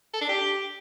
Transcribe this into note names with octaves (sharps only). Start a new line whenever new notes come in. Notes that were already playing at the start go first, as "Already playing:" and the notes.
A4
D4
G4